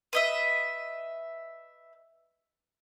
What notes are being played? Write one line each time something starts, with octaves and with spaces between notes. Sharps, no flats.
B4 D#5 E5